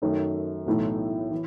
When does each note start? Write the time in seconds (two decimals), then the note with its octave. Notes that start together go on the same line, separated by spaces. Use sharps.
0.02 F#2 D#3 A3 D#4
0.66 B1 A2 E3 A3 D#4
1.31 E3